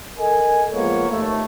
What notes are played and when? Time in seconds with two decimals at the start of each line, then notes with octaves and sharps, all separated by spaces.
0.18 A4 A#4 D#5 G#5
0.72 F3 G#3 A#3 B3 C#5
1.09 D#2 A3